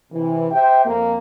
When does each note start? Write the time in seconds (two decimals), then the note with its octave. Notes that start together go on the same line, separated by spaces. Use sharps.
0.12 C3 E3
0.51 G4 C5 E5 G5
0.86 F2 A#3